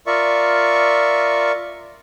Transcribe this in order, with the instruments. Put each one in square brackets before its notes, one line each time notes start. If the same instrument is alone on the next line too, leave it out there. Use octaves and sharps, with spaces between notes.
[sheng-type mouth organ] F4 A#4 D5 E5 C#6